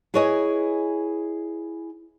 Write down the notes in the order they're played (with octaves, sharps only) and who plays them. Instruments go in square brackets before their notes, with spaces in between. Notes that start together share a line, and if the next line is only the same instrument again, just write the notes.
[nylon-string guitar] E4 G#4 B4 C#5 D#5 G#5